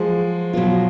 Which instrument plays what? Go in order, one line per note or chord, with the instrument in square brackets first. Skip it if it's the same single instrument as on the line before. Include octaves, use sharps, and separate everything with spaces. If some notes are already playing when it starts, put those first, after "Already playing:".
Already playing: [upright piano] F3 G#3 [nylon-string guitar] F#3
[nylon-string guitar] B2 F#3 B3 F4